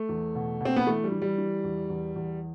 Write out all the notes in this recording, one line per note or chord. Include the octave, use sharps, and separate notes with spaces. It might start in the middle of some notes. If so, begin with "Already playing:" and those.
Already playing: A3
E2
B2
B2 C4
B3
E3 A3
G3
E3
G3
E3
E2
E2
E2